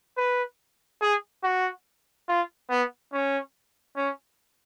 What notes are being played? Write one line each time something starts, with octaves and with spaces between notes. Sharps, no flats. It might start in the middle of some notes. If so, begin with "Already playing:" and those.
B4
G#4
F#4
F4
B3
C#4
C#4